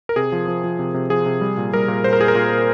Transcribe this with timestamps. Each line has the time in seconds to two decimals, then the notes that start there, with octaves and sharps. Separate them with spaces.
0.09 A#4
0.16 C3 G#4
0.32 F3
0.48 F3
0.64 F3
0.79 C3
0.94 C3
1.10 F3 G#4
1.26 C3
1.41 G3
1.57 A#2
1.73 G3 A#4
1.88 A#2
2.04 A#2 C5
2.13 A#4
2.19 A#2 G#4
2.28 A#4
2.35 A#2
2.51 A#2